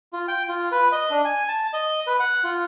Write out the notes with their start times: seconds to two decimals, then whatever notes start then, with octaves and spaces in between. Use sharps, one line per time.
0.13 F4
0.28 G5
0.49 F4
0.72 B4
0.92 D#5
1.11 D4
1.25 G#5
1.48 A5
1.73 D#5
2.07 B4
2.20 F#5
2.44 F4